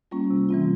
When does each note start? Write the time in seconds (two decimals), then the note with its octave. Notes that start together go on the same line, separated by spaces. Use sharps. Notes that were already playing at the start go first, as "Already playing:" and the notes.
0.11 G3 A#3 C#4 F4
0.30 C3
0.49 E3 G3 C4 F4